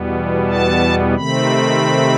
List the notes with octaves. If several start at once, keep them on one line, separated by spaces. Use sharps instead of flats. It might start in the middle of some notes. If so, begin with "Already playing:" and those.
Already playing: E2 B2 G3 B3
A5
C3 D#3 A3 C4 B5